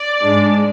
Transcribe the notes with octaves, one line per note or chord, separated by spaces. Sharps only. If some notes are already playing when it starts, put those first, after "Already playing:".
Already playing: D5
G#2 G#3 D4